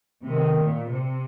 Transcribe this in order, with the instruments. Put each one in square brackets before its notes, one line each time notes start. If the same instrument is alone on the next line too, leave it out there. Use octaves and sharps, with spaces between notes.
[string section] C3 [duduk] D#3
[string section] A#2
C3